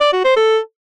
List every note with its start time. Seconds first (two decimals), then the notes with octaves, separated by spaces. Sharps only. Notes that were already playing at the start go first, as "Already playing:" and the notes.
0.01 D5
0.13 F#4
0.25 C5
0.37 A4